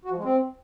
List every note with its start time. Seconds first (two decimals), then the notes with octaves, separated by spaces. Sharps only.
0.05 F#4
0.11 F3
0.18 G#3
0.24 C4